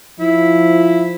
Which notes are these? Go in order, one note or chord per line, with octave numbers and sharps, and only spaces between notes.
F3 E4